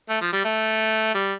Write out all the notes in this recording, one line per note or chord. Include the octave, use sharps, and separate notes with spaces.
A3
F3
G3
A3
G3